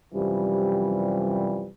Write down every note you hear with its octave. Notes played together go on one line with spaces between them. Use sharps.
F#2 C3 E3 F3 G3